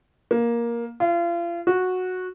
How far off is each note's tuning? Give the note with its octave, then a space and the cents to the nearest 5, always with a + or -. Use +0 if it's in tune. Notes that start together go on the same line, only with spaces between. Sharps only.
A#3 +10
F4 -35
F#4 -10